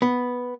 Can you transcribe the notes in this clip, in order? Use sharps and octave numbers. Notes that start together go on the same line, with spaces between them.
B3